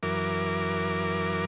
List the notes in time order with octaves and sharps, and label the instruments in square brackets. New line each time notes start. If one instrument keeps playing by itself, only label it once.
[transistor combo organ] F#2 E3 A#4 D6